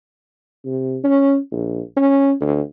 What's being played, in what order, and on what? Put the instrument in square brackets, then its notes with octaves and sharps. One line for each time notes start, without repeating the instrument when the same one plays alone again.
[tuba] C3
C#4
A#1
C#4
D2